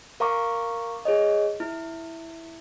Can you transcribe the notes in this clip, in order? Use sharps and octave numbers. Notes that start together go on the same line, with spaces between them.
A#4 F5 A#5 C#6 D6
G#4 C#5 D#5
E4